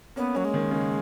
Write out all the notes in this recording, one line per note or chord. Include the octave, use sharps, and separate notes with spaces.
A#3 B3 C#4
F#3 A#3 C#4
G#3
D#3
C#3